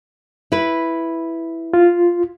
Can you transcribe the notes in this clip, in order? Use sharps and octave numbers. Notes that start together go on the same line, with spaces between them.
E4 B4
F4